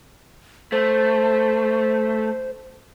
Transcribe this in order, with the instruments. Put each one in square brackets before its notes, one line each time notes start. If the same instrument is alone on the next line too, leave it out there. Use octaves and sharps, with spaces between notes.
[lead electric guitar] A3 [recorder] C5